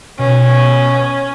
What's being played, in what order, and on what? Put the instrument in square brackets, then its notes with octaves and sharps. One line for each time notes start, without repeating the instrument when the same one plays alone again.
[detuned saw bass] B2 [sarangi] C#4